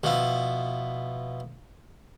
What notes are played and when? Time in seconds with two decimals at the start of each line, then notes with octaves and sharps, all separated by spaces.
0.04 B2 F3 E4